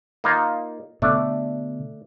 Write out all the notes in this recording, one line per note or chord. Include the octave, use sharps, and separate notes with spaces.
A#3 D#4 F4
B2 D3 A3 D4